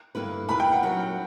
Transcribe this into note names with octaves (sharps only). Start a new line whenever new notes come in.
G2 D3 A#3 E4 B4
A#2 A#3 E4 B4 B5
G5
F#5
F#3 C#4 E4 A#4